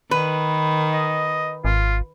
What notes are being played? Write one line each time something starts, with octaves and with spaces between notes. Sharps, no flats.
D#3 B4
D#5
G#1 F4